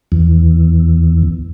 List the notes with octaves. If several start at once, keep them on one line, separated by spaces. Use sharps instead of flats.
E2